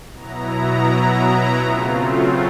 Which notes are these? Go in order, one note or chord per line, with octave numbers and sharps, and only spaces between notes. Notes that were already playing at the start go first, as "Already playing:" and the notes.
B2 F#3 B3 E4 A#5
C#3 F#3 A3 C4 F4